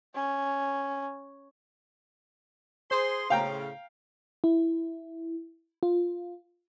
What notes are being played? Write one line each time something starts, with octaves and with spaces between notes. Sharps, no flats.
C#4
G#4 C5 C6
A2 C#3 F5 G5 A#5
E4
F4